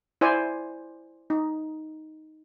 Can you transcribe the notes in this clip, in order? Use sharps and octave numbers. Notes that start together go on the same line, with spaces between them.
E4 C5 D5 G#5
D#4